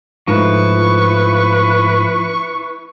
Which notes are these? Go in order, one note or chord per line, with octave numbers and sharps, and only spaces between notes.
G#2 F3 A3 E4 B4 C#6